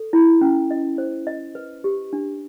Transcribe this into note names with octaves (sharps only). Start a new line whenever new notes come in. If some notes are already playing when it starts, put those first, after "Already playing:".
Already playing: A4
E4
C#4
D#5
C5
D#5
B4
G4
D4